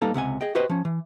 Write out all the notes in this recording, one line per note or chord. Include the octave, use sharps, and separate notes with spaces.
G3 A#3 B3 D#4 A4
C#2 C3 F#5 G#5
G#4 D#5 G5
F#4 G4 B4 C5 D#5 G5
F3 C#4
E3